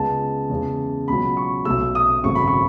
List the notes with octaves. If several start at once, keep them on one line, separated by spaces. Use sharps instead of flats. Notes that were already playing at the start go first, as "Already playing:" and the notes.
Already playing: C#2 C#3 G#3 B3 A5
E2 C#3 G#3
C#2 B2 F#3 B5
C#6
B1 B2 A3 E6
D#6
G#1 F#2 C#3 F#3 A3 C#6
B5
C#6